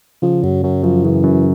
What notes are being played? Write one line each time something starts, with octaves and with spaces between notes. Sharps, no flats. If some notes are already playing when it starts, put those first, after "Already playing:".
C#3 F3
F#2 F#3
F#2 F#3
F#2 F3
C#3 E3
F#2